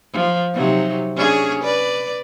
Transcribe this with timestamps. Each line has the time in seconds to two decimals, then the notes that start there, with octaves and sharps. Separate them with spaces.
0.13 F3
0.54 C3 F#3 D#4
1.16 C#4 D4 G#4
1.63 B4 D5